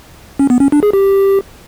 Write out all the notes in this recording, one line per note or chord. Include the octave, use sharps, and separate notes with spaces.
C#4
B3
C#4
D4
G#4
G4